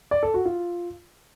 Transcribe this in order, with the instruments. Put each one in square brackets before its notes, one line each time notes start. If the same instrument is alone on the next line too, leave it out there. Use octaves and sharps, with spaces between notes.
[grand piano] D5
A4
F#4
F4